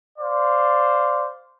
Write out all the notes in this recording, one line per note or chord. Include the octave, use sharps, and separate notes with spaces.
C5 D5 F5